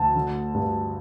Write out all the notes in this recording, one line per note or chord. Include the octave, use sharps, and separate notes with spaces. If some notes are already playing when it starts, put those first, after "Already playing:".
Already playing: D2 A5
D3
G2